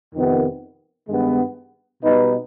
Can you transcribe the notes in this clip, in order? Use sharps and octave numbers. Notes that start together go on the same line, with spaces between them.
F2 C3 D#3 B3
G2 D#3 G#3 B3
B2 G3 B3 D#4 B4